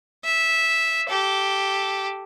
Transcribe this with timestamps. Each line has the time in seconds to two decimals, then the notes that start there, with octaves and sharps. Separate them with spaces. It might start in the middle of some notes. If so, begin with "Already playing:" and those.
0.24 E5
1.09 G4 A4